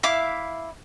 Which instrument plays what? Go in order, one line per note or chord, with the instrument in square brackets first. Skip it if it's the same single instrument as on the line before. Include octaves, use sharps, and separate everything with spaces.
[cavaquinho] E4 E5 F5 D6